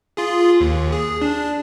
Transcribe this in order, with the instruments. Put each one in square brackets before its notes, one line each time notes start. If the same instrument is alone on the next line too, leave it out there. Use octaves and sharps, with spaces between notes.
[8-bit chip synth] F4 G#4
D#2
G#4
D4